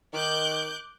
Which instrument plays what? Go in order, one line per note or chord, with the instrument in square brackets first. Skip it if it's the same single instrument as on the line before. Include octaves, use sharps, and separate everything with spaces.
[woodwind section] D#3 [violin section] D6 F#6 G6